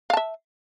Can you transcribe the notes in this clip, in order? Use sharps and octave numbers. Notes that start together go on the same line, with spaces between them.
E5 F5 A5